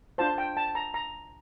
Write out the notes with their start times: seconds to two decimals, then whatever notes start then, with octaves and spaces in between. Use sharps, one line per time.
0.18 D4 F4 C5 A5
0.38 G5
0.57 A5
0.75 A#5
0.94 A#5